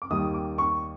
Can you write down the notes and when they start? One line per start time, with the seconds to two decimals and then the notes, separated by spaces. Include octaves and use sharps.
0.02 D6
0.10 D#2 D#3 G3 D#6
0.34 D6
0.58 C#6